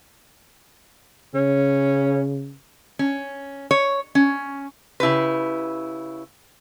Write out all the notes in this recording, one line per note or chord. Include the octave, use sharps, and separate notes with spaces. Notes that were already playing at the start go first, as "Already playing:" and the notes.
C#3 C#4
C#4
C#5
C#4
C#3 E4 G4 B4